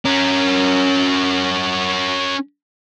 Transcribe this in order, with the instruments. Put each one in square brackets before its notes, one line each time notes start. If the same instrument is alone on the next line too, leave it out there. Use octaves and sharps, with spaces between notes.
[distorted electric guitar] C#4 A#4